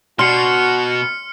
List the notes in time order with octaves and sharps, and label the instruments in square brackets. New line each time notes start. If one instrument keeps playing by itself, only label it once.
[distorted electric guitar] B2 [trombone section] F#4 [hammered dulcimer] C6 [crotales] F6 C#7